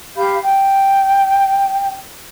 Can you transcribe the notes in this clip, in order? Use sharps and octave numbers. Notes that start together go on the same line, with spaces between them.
G4 F5 B5 G6
G5